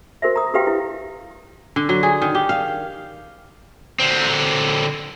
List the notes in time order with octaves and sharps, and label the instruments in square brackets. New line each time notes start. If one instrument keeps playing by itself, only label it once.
[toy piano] F#4 A#4 C5 E5
A#5 D#6
F#4 G4 B4 E5 F5 G5
E4
[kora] D3
F#3
G#4
D#3
G4
F5
[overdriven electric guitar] D3 C4